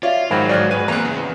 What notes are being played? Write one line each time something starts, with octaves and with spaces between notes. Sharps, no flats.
F4 C#5 D5 E5 F5
G#2 D#3 F3 F#3 C5 G5 B5
G1 D5 F6 F#6
B4 C#5 G#5 D#7
E2 A#3 C4 A#5
C#3